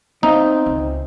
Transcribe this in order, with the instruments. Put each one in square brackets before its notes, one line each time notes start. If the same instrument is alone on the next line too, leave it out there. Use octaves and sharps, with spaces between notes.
[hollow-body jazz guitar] B3 E5 F5 [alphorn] C4 [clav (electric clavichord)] D#4
[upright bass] C#2